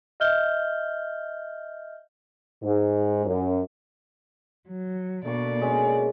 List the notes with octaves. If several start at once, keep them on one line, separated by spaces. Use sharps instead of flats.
D#5 E5 F6 G6 G7
G#2
F#2
F#3
B2 D3 A#3 D5 C#6
G#3 C#4